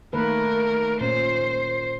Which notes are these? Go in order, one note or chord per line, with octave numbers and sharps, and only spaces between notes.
D#3 A3 A#3 A#4 B4
A#2 C#4 C5